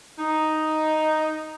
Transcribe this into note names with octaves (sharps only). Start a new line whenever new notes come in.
D#4